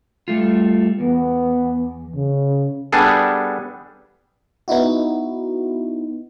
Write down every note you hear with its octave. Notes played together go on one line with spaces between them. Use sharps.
G3 A3 F4
E2 B3
C#3
G3 B3 D4 G#4 A4
B3 D#4 E4 F#4